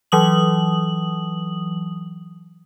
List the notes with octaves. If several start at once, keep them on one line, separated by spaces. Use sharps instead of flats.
E3 F#3 D#6 F#7